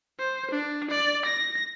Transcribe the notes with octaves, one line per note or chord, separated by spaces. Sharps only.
C5
D4
D5
A#6